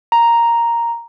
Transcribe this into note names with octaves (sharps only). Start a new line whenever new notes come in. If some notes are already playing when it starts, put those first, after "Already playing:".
A#5